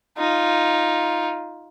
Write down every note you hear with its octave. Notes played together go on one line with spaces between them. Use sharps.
D#4 F4